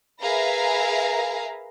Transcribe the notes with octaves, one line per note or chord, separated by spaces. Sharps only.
G#4 A#4 B4 E5 F5 A#5